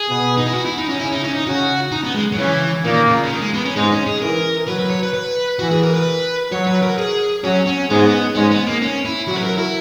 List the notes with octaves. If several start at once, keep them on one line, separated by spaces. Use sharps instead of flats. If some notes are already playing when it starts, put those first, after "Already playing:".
Already playing: G#4
B2 B3
D#4
E4
F#4
E4
D#4
C#4
C#3 C#4 E4
D#4
C#4
D#4
C#3 C#4 F#4
D#4
B3
G#3
F#3
C#3 E3 C#4
A#2 D#3 A#3
C#3
C#3
D#3
G#3
B3
C#4
G#2 G#3 D#4
C#4
G#4
E3 A#4
F#3 B4
B4
C#5
B4
B4
E3 F#4
G#4
A#4
B4
F#3 C#5
B4
A#4
G#4
F#3 C#4
C#4
G#2 G#3 B3
G#2 G#3 C#4
B3
A#3
C#4
E4
F#3 F#4
B4
A#4
E4